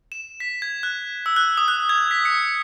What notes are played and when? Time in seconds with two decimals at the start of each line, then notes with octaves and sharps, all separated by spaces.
0.12 E7
0.40 B6
0.62 G#6
0.83 F#6
1.26 E6
1.36 F#6
1.57 D#6
1.68 F#6
1.89 G#6
2.11 B6
2.25 C#7